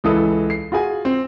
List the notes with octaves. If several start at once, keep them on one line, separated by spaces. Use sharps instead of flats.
C#2 E3 A4 D#6
C7
F4 F#4 G#4 G#5
C4